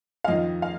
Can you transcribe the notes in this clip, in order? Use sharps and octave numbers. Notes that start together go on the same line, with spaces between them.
F5
F2 D#3 D#5
F5